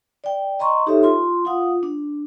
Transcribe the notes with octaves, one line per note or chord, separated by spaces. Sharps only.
D5 G5
D#5 A#5 C6 C#6
D#4 G4 A4 C#5 E5
F4 C6
F4 F5 F#5 D#6
D4